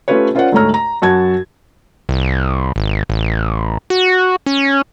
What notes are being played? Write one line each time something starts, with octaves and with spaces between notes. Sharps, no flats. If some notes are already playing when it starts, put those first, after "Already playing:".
A3 C#4 F4 G4 B4 C#5
C#4 F4 A#4 C5 D5 F#5
D2 G#2 A3 C#5 A#5 F6
A#5
F#2 F#4 A5 G#6
C2
G#1
A1
F#4
C#4